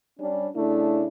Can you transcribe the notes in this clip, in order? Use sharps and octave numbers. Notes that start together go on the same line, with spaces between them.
G3 C#4 D4
C#3 A3 D4 E4